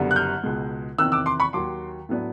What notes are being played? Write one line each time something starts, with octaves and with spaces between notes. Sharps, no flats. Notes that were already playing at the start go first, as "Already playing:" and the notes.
Already playing: F#1 F#2 D3 G3 B3
F#6
F6 G6
C#2 B2 G#3
E2 C3 D#3 E6 F#6
D6 E6
C6 D6
B5 C#6
D#2 D#3 F#3 C6 D6
A2 F#3 B3 D4